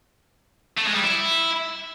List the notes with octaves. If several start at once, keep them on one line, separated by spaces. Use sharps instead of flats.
A3
G#3
G3
E4